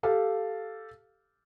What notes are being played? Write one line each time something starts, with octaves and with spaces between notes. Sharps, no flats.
G4 A4 F5